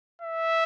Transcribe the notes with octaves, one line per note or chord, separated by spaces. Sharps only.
E5